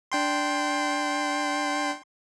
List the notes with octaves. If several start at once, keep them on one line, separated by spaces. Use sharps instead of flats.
D4 G5 C6